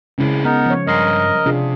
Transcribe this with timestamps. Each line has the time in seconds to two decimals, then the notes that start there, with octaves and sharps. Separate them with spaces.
0.18 C#2 C#3 G#3 C#4 E4
0.45 B3 D#4 A#4
0.66 F3 C#5
0.87 G2 A#4 D#5 C6
1.46 C3 D4 F4 G#4